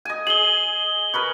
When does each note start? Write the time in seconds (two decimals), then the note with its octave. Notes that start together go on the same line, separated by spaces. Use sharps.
0.05 D#5 G#5
0.27 G#4 F#7 G7
1.14 A#4 B4 C#5